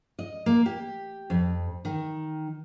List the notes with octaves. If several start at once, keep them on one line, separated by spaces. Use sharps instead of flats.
D#5
A#3
G4
F2
D#3